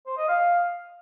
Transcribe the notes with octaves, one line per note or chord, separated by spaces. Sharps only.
C5
D#5
F5